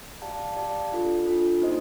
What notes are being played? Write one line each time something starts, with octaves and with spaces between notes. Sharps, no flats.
G4 D5 F5 A5
G4 D5 F5 A5
D4 F4 A4
D4 F4 A4
A#3 D#4 G4 C5 D#5